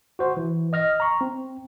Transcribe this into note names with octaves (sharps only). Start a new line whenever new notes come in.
F#4 C5
E3
D#5 F6 A#6
A#5 C#6
C4